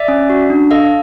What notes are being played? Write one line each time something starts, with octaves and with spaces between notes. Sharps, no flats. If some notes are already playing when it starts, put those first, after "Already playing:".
Already playing: D5 E5
C#4
F#4
D4
A4 D#5 F5